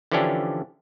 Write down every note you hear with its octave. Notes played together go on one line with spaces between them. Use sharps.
D3 E3 F3 C#4 D4 G4